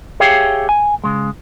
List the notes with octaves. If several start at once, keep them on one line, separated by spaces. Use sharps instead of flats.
G4 G#4 C#5 E5 F5 G5
G#5
C#3 G#3